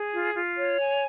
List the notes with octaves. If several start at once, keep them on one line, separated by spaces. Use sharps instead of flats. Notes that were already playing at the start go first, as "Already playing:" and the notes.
Already playing: G#4
F4
F4
C#5
G#5